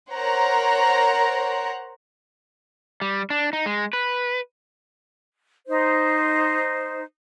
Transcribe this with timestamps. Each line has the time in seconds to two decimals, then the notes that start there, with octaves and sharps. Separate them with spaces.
0.12 A#4 C5 C#5 F#5 A#5
3.02 G3
3.30 D4
3.53 D#4
3.66 G#3
3.93 B4
5.67 D#4 C5